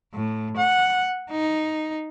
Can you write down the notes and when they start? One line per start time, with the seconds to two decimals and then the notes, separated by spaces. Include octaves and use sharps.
0.14 A2
0.57 F#5
1.31 D#4